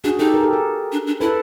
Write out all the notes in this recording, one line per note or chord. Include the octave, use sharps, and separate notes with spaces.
D4 F#4 G#4
D#4 G4 A4
G#4 A#4
G4 A4
G#4 A#4
D4
D4
E4 A4 B4